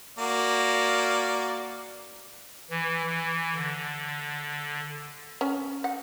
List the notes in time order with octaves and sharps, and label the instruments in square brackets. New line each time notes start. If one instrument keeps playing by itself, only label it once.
[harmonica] A#3 F#4 D5
[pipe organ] E3
E3
D3
[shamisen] C#4
F#5